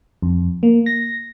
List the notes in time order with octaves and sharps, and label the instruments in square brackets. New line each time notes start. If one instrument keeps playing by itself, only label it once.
[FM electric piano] F2
A#3
A#6